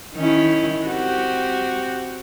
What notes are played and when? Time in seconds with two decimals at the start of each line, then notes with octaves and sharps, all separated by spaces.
0.16 D#3 C#4 E4
0.84 C4 F#4 G4